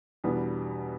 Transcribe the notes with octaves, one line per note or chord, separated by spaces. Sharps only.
E2 B2 G3 B3 D4